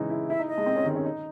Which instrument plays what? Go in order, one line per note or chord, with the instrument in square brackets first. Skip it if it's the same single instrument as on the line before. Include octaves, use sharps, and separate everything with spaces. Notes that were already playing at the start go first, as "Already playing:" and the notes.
Already playing: [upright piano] C#3 E3 G#3 D#4
E4
[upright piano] E4 [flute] E5
[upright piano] D#4
[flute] D#5
[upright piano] G#3
C4
C#4
D#3
C#4
D#4